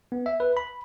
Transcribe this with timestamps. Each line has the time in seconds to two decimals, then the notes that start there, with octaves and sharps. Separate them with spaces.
0.12 B3
0.26 E5
0.40 B4
0.57 B5